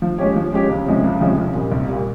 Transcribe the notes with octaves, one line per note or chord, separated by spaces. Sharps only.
F3
G#3 C#4 G4 C#5
F3
G#3 C#4 G4 C#5
C#2
C3 F3 G#3 C#4
C#2
C3 F3 G#3 C#4
C2
A#2 G3
C2
A#2 G3